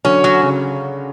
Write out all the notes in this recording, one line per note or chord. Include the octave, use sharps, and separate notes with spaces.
D3 F#3 C#4
F#3
C#3